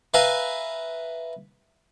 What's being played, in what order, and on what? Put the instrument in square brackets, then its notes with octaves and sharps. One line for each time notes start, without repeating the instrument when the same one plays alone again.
[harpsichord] B4 E5 F5 G#5 A#5